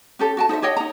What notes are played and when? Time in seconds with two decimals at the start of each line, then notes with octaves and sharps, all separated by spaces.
0.19 C#4 G4 A4
0.37 F#4 G5 A5
0.49 D#4 C5 D#5 E5
0.62 G4 C#5 D#5 G5
0.77 D#4 A#5